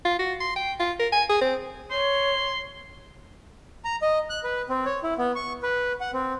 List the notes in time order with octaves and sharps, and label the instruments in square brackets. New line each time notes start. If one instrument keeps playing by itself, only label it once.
[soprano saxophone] F4
F#4
C6
G5
F4
A#4
G#5
G#4
C4
[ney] C#5 [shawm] C6
[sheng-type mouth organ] A#5
D#5
F#6
B4
C4
C#5
E4
B3
C#6
B4
F#5
C4